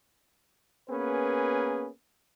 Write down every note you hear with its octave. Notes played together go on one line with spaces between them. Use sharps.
A#3 B3 C#4 G#4 A#4 B4